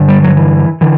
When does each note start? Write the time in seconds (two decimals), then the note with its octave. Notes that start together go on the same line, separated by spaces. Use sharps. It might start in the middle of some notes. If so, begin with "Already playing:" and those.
Already playing: G2 D3
0.08 G3
0.23 F#3
0.37 E3
0.81 D3 E3